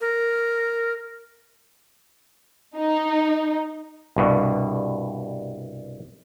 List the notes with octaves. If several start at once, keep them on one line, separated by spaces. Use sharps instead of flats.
A#4
D#4
C2 G2 B2